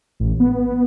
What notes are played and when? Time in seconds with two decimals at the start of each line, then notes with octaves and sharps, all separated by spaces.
0.20 A1
0.40 B3